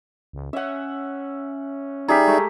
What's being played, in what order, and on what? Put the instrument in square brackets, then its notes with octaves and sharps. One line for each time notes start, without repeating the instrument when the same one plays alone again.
[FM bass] C#2
[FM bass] C#4 [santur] E5 F#5
[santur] G3 G4 G#4 [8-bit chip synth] D#4 D5 E5 [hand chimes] A#5 B6
[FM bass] G#3 [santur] A3